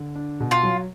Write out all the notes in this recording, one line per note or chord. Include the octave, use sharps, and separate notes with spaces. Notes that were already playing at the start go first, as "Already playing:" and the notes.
Already playing: D3
D4
B2
F4
F#3